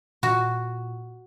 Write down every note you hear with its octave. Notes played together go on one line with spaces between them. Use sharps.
A#2 F#4